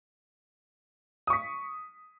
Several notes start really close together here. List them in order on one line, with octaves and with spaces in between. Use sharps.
D#6 C#6 B6